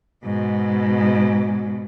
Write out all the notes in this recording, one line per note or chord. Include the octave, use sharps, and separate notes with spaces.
G#2 B2